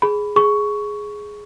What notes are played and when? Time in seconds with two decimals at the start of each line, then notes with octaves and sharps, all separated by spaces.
0.02 G#4 B5
0.36 G#4 C#6